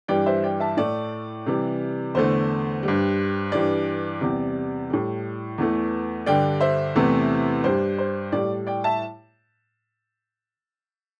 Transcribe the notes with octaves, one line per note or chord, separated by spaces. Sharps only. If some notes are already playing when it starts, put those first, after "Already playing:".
G2 E3 G3 D5 G5
C5 E5
D5 G5
E5 A5
A2 A3 D5
C3 E3 G3
E2 D3 A3 C5
G2 G3
G2 E3 G3 D5
E2 C3 G3
A2 G3
E2 E3 A3
G2 D3 G3 D5 G5
C5 E5
E2 C3 E3 A3
G2 G3 C5
C5
A2 G3 D5
D5 G5
E5 A5